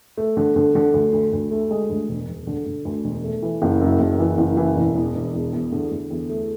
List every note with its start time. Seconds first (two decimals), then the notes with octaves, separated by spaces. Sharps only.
0.17 A3
0.37 D3
0.56 D3
0.75 D3
0.94 D2
1.13 D2
1.33 D2
1.51 A3
1.71 G#3
1.90 D2
2.09 E1
2.28 E1
2.47 D3
2.66 D3
2.85 D2
3.04 E1
3.24 A3
3.42 E3
3.62 F#1
3.81 F#2
4.00 F#1
4.19 E3
4.38 F#1
4.57 E3
4.76 E1
4.96 E2
5.15 E1
5.34 E2
5.53 E2
5.72 D3
5.91 D3
6.10 E2
6.29 A3